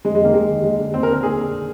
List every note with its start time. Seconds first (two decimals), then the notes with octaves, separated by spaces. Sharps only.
0.05 F2 G#3
0.15 G#3
0.20 C3 D#3 A#3
0.34 D#2 G#3
0.49 D#3
0.64 D#2 G#3
0.79 D3
0.94 D#2 C4
1.03 A#4
1.08 D3
1.13 A#4
1.23 D#2 G#4
1.38 D3